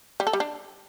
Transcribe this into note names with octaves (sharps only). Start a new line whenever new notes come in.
G3
A4
G3
D4